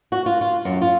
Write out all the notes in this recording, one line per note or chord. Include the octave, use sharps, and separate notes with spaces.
F#4
F4
F4
F#2
F4